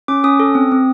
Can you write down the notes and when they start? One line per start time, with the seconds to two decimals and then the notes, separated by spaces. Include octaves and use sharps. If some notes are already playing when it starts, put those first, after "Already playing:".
0.08 C#4 D6
0.24 C#4 D#6
0.40 A4
0.55 C4
0.72 C4